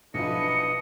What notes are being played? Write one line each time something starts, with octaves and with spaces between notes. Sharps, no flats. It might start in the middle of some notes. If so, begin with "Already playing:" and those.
B1 E3 F3 D4 B4 D#5 C#7